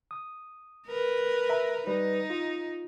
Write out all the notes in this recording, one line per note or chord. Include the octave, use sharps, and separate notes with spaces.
D#6
A#4 B4
E5 A#5
G3 D#4 B4
F4